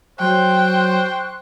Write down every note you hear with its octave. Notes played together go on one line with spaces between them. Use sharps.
F#3 C5 G5 C6 C#6 F#6